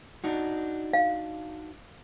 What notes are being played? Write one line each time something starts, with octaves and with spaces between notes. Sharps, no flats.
D4 D#4 F#4
F5